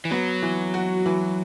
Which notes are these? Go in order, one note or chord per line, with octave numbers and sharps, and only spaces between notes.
E3
F#3 B3
E3
F#4
E3